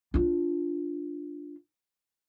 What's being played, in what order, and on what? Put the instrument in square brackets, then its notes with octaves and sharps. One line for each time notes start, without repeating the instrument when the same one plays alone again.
[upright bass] D4 F4